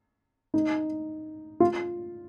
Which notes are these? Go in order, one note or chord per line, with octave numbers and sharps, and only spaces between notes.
D#4
F4